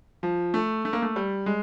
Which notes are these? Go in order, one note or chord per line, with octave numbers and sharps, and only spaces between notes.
F3
A3
A3
A#3
A3
G3
G#3